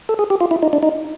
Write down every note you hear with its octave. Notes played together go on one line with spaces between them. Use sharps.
A4
G#4
G4
F4
E4
D#4
D4
D#4